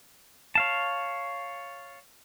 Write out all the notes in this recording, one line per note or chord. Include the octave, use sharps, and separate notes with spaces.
C#5 F5 A5